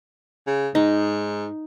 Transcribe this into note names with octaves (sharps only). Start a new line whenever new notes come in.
C#3
G#2 D#4